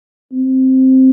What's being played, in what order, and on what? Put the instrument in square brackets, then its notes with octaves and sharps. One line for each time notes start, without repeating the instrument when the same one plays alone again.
[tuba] C4